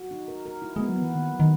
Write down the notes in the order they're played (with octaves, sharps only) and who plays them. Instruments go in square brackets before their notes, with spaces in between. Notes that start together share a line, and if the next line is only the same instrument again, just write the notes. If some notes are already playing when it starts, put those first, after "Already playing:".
Already playing: [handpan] F#4
D#4
A#4
A#4
E4
[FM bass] G#3 [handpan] B3
[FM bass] F#3
[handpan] B3
[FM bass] E3
[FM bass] D#3 [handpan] A#3
[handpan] F#3
[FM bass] D#3